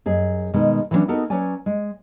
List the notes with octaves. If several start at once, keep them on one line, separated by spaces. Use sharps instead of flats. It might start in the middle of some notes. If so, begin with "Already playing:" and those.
F#2 G#4 D#5
B2 D#3 G#3
E3 F#3 G3 A3 C#4 D4
B3 D#4 F#4 A4 A#4
F#3 C#4 B4 D5 G#5
G#3